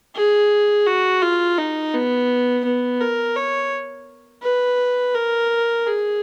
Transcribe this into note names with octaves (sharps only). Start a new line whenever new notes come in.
G#4
F#4
F4
D#4
B3
B3
A#4
C#5
B4
A#4
G#4